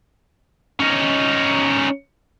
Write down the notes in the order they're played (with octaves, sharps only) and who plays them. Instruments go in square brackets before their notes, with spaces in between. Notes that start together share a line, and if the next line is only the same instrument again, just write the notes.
[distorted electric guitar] C#4 D#4